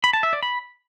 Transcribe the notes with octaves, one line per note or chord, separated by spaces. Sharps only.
B5
A5
E5
D5
B5